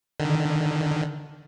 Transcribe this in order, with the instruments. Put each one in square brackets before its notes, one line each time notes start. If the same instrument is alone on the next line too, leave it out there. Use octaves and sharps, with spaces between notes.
[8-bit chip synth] D3 D#3